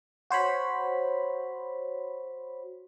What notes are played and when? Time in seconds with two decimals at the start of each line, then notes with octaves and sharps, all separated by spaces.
0.31 F#4 C5 C#5 B5